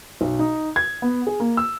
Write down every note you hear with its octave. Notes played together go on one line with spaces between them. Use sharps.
B1
D#4
G#6
B3
G#4
A#3
E6